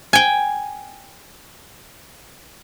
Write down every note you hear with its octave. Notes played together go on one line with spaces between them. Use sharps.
G5 G#5